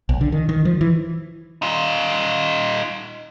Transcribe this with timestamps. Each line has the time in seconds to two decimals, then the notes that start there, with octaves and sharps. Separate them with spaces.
0.09 B1
0.21 D3
0.32 D#3
0.49 D#3
0.65 F3
0.81 E3
1.62 D#4 F4